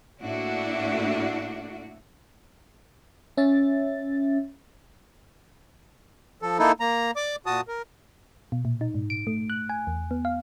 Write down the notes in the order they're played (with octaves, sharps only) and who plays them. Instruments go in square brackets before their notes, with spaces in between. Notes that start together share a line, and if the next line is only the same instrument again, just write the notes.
[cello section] A2 A3 A#3 D4 E4 F#4
[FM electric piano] C#4 E5 A6
[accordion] F3 A4
A#3 D#4 E4 A4
A#3 A#5
D5 D6
A#2 F#4 A5 D#6
A#4
[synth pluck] B2
A#2
D#4
G#2
D7
A3
F#6
G#5
E2
B3
F5